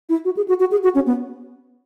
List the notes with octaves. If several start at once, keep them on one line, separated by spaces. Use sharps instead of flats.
E4
F#4
G#4
F#4
F#4
G#4
F#4
C#4
B3